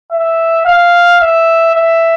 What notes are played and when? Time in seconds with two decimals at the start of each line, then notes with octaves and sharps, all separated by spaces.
0.11 E5
0.65 F5
1.21 E5
1.75 E5